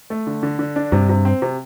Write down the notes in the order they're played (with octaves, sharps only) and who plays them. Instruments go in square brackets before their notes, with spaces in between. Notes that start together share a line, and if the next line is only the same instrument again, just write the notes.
[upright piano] A3
D3
D3
D3
D4
[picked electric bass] G2 [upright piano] C3
[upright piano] C3
C4
C3